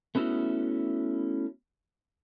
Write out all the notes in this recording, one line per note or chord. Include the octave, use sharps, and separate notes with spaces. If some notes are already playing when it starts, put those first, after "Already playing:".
A3 B3 C#4 E4 F#4